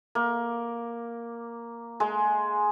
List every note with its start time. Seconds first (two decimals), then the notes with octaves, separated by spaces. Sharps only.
0.15 A#3
2.00 G#3